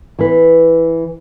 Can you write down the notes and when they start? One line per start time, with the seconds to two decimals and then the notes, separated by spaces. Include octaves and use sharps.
0.19 E3 B4